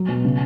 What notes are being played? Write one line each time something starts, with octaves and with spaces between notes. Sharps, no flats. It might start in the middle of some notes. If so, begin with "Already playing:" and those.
Already playing: F#3
B2
C#3